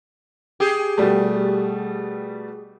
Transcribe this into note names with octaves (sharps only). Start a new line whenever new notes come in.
G4 G#4
B2 G3 A3